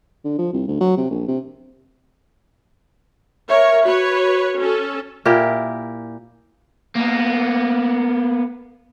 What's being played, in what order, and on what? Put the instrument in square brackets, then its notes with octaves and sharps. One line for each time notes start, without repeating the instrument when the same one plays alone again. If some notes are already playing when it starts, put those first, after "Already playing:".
[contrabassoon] D3
F3
C2
D2
F#3
C3
A#1
C3
[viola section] A#4 C#5 [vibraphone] E5
[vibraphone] F#4 [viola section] B4 C#5
[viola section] C#4 A4
[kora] A#2 E4 G4 A#4
[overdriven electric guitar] A#3 B3